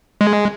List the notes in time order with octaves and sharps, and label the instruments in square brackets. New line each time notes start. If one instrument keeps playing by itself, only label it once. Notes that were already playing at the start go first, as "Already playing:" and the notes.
[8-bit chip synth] G#3